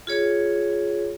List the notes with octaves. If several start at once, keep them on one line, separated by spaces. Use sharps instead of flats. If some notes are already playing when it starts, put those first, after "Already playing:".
F4 G#4 C#5